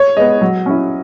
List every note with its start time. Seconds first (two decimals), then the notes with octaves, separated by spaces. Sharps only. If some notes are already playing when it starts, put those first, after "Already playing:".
Already playing: C#5
0.17 G#3 B3 D#5
0.41 F#3
0.66 C#4 E4